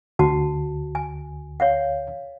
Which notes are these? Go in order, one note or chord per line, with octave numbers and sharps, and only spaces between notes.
D2 F#4 F#5 A5
G#5
C#5 F5 F#5